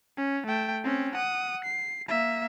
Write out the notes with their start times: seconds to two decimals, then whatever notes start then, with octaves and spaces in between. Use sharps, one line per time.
0.17 C#4
0.46 A3 G5
0.84 C4 C#4
1.15 F#5 D#6
1.65 C7
2.09 A#3 E5